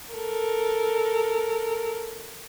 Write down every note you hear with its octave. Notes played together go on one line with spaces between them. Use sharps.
A4 A#4